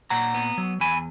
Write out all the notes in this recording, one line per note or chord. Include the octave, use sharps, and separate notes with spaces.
A#2 F#5 A#5
B3
F#3
E2 G#5 B5